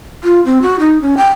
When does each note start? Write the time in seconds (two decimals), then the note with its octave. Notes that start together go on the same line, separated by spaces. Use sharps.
0.24 F4
0.45 C4
0.62 F#4
0.80 D#4
1.01 C#4
1.17 G5